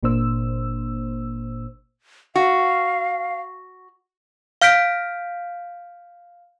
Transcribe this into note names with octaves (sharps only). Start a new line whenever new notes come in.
G1 A#2 A#3 D4 C5 E6
F#4 F5
F5 F6 G6 B6 D7